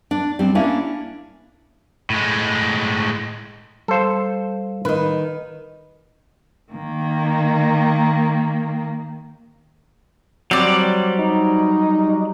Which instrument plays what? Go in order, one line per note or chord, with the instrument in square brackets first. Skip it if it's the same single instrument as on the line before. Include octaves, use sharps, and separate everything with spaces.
[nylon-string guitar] D4
G3 C4
A#3 C#4 D4 E4
[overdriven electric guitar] A2 G#3
[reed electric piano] G3 F5 [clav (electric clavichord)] A4 C5
[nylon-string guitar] D#3 D#4 [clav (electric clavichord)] B4
[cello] D#3 A#3
[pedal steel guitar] F#3 G3 [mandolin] C4 D5
[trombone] D#4